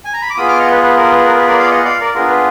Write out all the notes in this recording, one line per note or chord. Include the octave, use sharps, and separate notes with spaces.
G#5
A#5
B5
D6
B3 F4 G#4 B5 D#6
D6 F6
D#5 F#5
B4
B4
A#4
B4
A#4
B4
A#4 D5
D5 F5
D#5 F#5
D5 F5
A#4 D5
B3 D4 F4 G#4 A#4
B4